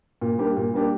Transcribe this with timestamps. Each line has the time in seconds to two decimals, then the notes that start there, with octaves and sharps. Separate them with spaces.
0.21 A#2
0.38 G3 A#3 D4 G4
0.57 A#2
0.74 G3 A#3 D4 G4